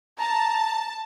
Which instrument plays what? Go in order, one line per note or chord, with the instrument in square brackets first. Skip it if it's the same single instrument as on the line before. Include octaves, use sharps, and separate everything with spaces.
[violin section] A5 [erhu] A#5